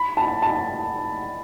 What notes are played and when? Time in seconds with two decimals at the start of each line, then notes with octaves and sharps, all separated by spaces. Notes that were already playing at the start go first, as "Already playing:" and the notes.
Already playing: B5
0.17 A5
0.42 A5